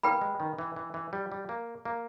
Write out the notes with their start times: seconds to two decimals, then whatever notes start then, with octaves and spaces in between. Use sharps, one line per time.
0.03 A#3 B4 G5 B5
0.21 G#3
0.40 D#3
0.59 E3
0.76 E3
0.94 E3
1.13 G3
1.32 G3
1.49 A#3
1.85 A#3